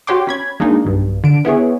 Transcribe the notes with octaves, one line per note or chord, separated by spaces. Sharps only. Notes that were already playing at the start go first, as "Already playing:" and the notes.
F#4 G4 C#5 G5 C6 D6
C#4 B5 G#6
G#3 A#3 D4 D#4
B1 G2
D3 D7
B3 E4 G#4 C#5